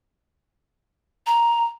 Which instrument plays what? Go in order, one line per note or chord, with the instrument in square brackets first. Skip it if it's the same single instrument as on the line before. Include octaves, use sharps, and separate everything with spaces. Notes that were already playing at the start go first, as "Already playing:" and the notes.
[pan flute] A#5